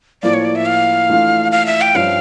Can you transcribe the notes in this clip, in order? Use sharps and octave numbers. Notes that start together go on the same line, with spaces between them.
A2 F3 A#3 D5
C#5
D5
E5
F5
E3 A3 D4 F4
F5
E5
G5
G2 F3 C#4 F5